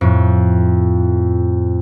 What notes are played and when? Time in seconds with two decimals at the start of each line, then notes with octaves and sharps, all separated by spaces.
0.01 F2 A2